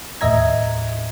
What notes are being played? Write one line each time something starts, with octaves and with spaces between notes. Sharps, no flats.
D#2 A2 D#5 E5 A#5 G#6